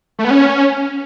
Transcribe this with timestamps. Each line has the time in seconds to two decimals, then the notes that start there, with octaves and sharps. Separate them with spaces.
0.19 A3
0.25 B3
0.31 C#4